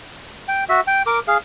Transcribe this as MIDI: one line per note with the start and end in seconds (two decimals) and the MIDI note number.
0.48 0.64 79
0.69 0.80 66
0.69 0.80 76
0.87 1.02 79
1.06 1.19 70
1.06 1.19 86
1.28 1.38 68
1.28 1.38 77